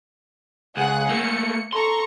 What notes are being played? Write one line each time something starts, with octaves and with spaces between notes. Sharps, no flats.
C#2 G#4 F#5 F#6
A3 A#3 C#7
A4 A#5 C6 C#6